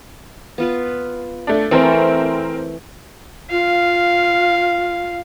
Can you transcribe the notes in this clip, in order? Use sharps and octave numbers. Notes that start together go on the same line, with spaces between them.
B3 F4 B4
A3 D4
E3 A3 C4 A4 A#4 C5
F4 F5